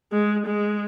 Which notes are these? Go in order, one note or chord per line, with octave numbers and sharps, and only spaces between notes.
G#3
G#3